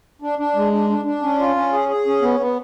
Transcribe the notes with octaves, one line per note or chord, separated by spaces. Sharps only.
D4
D4
G#3
D4
D4
D4
C#4
F4
C#4
G#4
G#4
C#4
B3
B3